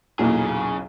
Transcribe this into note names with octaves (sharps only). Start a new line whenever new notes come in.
B1 E2 A#2 C#3 F#3 G#4